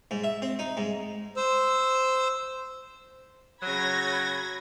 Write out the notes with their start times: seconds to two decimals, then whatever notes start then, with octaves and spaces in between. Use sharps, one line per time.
0.11 G#2
0.24 E5
0.42 C4
0.59 D#4
0.77 G#2
1.37 C5 E6
3.62 C#3 F#3 B5 G#6 A#6